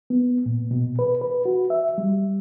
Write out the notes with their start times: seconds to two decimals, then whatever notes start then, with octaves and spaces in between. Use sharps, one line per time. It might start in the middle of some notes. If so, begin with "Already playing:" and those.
0.10 B3
0.46 A#2
0.71 B2
0.99 B4
1.21 B4
1.45 F#4
1.70 E5
1.98 G3